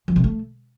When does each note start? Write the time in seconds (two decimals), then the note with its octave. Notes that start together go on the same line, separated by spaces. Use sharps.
0.08 F3
0.16 C3
0.24 A3